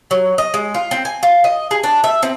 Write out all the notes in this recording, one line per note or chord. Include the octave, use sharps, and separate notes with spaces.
F#3
D#5
G#3
F4
C4
G#5
F4
D#5
G#4
D4
E5
C4